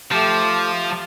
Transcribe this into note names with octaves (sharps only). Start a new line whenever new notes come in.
F3 A3 G4